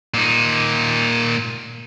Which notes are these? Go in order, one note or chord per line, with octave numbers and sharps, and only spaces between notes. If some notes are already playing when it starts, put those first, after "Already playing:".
A#2 D#4